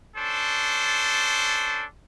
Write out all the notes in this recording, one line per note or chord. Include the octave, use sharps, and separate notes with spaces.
C#4 D4 A4 C5